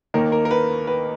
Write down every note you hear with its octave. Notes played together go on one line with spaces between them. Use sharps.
D#2 D#3 A#3 A#4
A#4
A#4
B4
B4